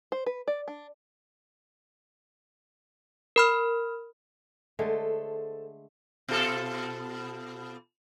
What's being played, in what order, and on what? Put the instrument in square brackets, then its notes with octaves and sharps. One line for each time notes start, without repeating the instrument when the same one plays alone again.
[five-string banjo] C5
B4
D5
D4
[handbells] A#4 B5 F6
[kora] D3 G#3 A3 [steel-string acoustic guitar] A4 C5
[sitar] B2 F4 A4